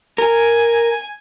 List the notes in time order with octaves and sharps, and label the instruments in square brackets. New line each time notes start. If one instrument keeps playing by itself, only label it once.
[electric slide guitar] A#4 [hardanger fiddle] G#5